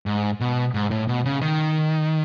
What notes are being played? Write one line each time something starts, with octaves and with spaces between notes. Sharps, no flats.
G#2
B2
G#2
A2
B2
C#3
D#3